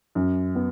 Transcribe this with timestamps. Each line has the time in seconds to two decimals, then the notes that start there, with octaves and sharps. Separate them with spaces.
0.15 F#2
0.55 B3